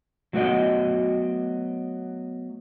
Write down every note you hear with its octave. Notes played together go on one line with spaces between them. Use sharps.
F#3 A3 B3 F#4 D5 D#5